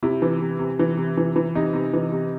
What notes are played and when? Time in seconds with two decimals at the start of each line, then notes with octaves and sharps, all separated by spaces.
0.03 C3 E4
0.22 E3
0.41 C3
0.59 C3
0.79 E3
0.97 C3
1.17 E3
1.36 E3
1.55 C3 D#4
1.74 C3
1.93 E3
2.12 C3